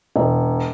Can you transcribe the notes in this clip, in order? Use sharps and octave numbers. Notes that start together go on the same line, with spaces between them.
E1